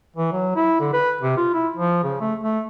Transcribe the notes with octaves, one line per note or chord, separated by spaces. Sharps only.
E3
F#3
E4
D3
B4
C3
F4
E4
F3
C#3
A3
A3